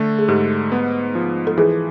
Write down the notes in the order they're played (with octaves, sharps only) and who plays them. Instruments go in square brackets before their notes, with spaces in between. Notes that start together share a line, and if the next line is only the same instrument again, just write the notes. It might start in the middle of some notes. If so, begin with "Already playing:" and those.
Already playing: [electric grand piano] D3 A3
[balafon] G#4
[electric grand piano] G#2 [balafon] G4
[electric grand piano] B3
F3
[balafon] A4
[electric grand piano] E3 [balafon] G#4